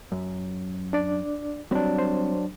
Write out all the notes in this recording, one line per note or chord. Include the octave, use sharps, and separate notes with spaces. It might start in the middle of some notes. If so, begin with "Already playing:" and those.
F#2
D4 D5
F#3 G3 C4 D4 B5
C5